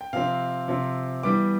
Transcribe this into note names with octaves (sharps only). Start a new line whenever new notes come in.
G5
C3 F3 C4 F5
C3 F3 C4
E3 G3 B3 D6